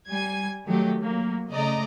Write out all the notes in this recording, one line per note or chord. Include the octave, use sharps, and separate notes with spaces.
G3 G#5 G#6
D#3 F#3 A3 G4
F#3 A#3
C#3 A3 D5 D#5 A#5